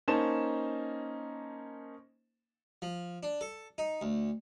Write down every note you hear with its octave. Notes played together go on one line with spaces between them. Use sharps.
A#3 C#4 D#4 C5 A5 E7
F3
D4
A4
D#4
D2